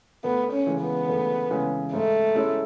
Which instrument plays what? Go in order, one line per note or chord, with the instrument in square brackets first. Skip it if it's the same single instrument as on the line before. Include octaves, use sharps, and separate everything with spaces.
[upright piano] D2 [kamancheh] B3
[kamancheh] C#4
[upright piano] C#3 E3 G#3
[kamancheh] B3
[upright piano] D2
C#3 E3 G#3
[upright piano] G#2 [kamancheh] A3
[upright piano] G#3 C#4 E4